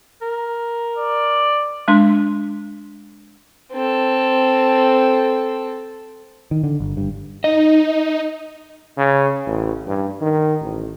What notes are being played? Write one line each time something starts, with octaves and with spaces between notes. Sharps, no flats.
A#4
D5
G#3 D4 C6
C4 A4
D#3
D3
G1
G2
D#4 D#5
C#3
A1
G2
D#3
A1